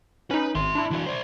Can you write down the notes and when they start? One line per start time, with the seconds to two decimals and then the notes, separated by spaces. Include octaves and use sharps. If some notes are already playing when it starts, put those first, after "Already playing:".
0.31 C#4 D#4 B4
0.55 G#1 E5 C6
0.75 D4 E4
0.91 E3 F#4
1.06 C5 D5